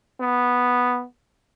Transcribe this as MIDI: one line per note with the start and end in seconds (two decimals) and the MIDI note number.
0.20 1.04 59